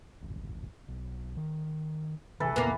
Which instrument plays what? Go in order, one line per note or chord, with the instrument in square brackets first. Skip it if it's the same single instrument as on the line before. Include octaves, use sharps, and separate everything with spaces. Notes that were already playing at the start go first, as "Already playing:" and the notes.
[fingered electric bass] D1 G#1
B1
D#3
[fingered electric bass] A1 C3 D#3 [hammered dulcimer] E3 A4 B4
[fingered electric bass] E2 A#2 C#3 [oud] A#3 B3